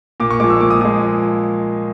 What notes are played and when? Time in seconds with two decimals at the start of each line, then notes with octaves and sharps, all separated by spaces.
0.20 A#2 D6
0.31 C#6
0.40 F3 G#3 D6
0.50 E6
0.60 A#2 D6
0.70 D#6
0.81 F3 D#6
0.85 G#3